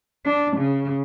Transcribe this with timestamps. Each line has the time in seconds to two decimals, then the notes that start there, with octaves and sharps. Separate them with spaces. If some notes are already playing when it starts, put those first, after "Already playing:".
0.25 D4
0.57 C#3